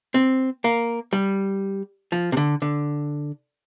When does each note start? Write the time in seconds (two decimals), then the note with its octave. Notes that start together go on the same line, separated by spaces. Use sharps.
0.14 C4
0.64 A#3
1.13 G3
2.12 F3
2.32 C3
2.37 D3
2.62 D3